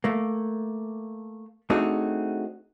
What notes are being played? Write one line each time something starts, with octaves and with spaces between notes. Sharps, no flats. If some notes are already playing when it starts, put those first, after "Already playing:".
A3 A#3
A3 C4 D4 D#4 F#4 G#4